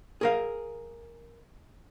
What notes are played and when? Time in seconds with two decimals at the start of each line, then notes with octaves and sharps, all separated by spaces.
0.21 G#4 A#4 F5